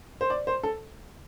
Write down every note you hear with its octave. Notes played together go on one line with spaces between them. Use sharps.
C5
D5
C5
A4